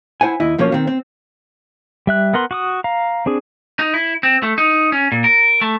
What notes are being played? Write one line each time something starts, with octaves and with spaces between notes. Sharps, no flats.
E4 C5 F#5 G#5
D#2 E4 D#5
B1 F3 A#3 C#4 C#5
D#3 C4
C4
G3 E5 F#6
B3 A#4 F#5 C6
F#4 D6 D#6
F5 A#5
C4 D4 G#4
D#4
E4
C4
A3
D#4
C#4
A#2
A#4
A3